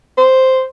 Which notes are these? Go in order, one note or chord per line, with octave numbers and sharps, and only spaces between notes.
C5